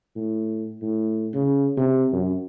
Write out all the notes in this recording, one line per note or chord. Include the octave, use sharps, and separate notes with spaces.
A2
A2
C#3
C3
F#2